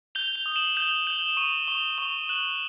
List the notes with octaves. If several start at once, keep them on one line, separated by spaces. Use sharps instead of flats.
G6 F7 G7
F7 G7
D#6
G7
E7 F#7
G6 F7 G7
G6 E7 F#7
C#6 D#7 F7
C#6 F7 G7
C#6 F7 G7
F#6 E7 F#7